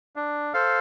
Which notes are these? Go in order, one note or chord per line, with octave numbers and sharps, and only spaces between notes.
D4
A4 C5 F5